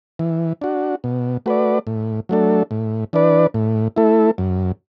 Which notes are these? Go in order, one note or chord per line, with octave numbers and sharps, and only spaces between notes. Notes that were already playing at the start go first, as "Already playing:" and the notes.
E3
D4 F#4
B2
A3 F#4 B4 D5
A2
F#3 A3 D4 A4
A2
E3 D4 B4 D5
A2
A3 E4 A4
F#2